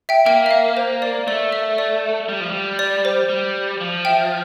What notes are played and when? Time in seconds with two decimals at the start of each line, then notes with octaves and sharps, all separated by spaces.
0.09 E5 G5
0.26 A#3 E5 G5
0.46 E5
0.51 F5
0.77 C5
1.02 D5
1.27 A3 D5
1.52 E5
1.78 D5
2.29 G3
2.40 F3
2.51 G3
2.79 D5
3.05 C5
3.29 G3
3.81 F3
4.05 E5 G5